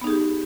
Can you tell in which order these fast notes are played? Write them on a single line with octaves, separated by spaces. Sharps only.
B3 D#4 G#4 G4